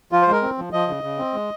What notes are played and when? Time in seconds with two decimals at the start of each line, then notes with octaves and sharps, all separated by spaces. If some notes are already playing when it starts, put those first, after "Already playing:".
0.12 F3 F4
0.22 C5
0.28 G#3 A#4
0.42 C4
0.58 F3
0.73 F3 D#5
0.88 C#3
1.03 C#3
1.18 C4
1.34 G#3